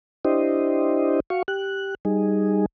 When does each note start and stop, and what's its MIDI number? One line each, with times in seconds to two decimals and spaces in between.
0.25 1.20 62
0.25 1.20 64
0.25 1.20 67
0.25 1.20 72
0.25 1.20 75
1.30 1.43 66
1.30 1.43 77
1.30 1.43 85
1.48 1.95 67
1.48 1.95 90
2.05 2.66 55
2.05 2.66 63
2.05 2.66 68